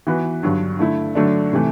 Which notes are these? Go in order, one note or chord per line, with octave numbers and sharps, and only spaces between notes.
E3 B3 F#4 B4
G2 D3 F#3
D3 A3 E4
D3 F#3 A3 D4
C3 E3 A3